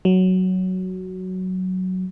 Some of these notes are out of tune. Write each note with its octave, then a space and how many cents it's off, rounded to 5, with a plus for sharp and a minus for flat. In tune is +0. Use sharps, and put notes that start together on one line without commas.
F#3 +5